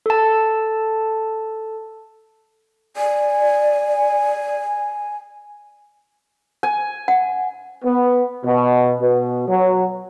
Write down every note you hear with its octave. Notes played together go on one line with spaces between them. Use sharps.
A4 A5
D5 G#5
G#5
F#5
B3
B2
B2
F#3